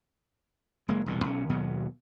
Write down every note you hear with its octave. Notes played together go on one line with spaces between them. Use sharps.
F#1 G#3 A#3
E1 C2 A#2
B1 C#4
D#2 B2 F#3 B3